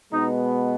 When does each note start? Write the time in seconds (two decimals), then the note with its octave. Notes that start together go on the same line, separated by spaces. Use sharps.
0.12 B2 G#3 B3 D#4